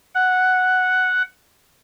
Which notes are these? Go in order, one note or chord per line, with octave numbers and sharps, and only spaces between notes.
F#5